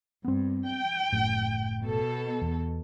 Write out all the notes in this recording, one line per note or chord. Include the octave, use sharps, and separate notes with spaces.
G2 B3 C4
G5
F#1 A2
B2 A4
E2